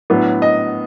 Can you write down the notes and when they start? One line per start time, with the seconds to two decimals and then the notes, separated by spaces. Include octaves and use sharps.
0.10 A2 F#3 B3 D4
0.42 D#5